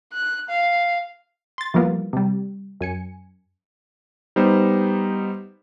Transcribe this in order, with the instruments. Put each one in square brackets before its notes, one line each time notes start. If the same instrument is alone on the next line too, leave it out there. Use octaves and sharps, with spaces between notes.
[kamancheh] F#6
F5
[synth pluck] C6 A6
E3 F3 G3 A#3 B3
C3 G3
F#2 G#5 C#7
[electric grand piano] G3 B3 D#4 C5